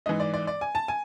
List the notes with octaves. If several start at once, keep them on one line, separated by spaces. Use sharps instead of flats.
G#2 E3 D#5
D5
D5
D5
G#5
A5
G#5